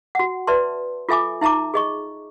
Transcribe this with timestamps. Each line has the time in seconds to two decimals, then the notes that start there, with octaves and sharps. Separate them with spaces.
0.15 F#4 F#5
0.47 B4 D5 E5 A5 C6
1.09 F4 A4 E5 G#5 D6
1.41 D#4 E5 A5 A#5 D6
1.74 G#4 D#5 C#6